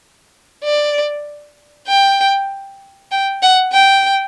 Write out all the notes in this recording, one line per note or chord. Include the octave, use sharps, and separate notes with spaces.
D5
G5
G5
F#5
G5